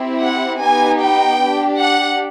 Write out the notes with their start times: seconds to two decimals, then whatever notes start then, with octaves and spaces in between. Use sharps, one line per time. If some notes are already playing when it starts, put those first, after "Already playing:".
Already playing: C4 E4 G4
0.21 F#5
0.60 B3 D#4 G4 G#5
1.01 G5
1.40 D4 G4
1.80 F#5